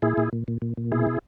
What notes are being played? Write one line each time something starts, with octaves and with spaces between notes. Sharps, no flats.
A#2 E4 G#4
A#2
A#2
A#2
A#2
A#2
B2 E4 G#4
B2